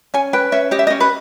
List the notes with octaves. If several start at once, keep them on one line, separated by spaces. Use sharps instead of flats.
C#4 G#5
B4 G5
C#4 E5
G4 D#5
E5
D#5
C#4
B4